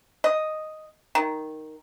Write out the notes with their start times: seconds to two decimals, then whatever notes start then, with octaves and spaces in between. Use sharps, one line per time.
0.24 D#5
1.15 D#3